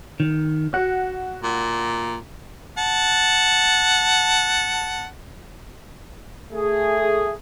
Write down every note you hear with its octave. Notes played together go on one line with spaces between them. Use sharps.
D#3
F#4 F#5
A#2
F#5 A5
A3 G#4